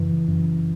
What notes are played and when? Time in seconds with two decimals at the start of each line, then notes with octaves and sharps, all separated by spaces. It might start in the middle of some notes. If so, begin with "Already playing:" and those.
Already playing: F#2 C#3 E3
0.28 F#2